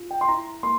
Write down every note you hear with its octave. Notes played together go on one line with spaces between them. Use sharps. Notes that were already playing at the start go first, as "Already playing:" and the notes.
Already playing: F4
G5
C6
E4 A#5
A#3 C6